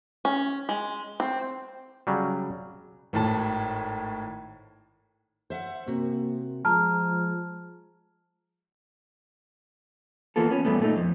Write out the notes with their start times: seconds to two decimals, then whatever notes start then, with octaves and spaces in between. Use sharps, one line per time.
0.25 C#4
0.69 G#3
1.20 C4
2.07 C#3 F#3 G3
3.13 G#1 A2 A5
5.50 C5 E5 F#5
5.88 C3 A#3 F#4
6.65 F3 G#3 A5 A#5 F6
10.36 E3 A#3 B3 F4 A4
10.50 B3 C#4
10.65 E2 G2 A3 B3
10.80 A#2 A3 D#4
10.96 F2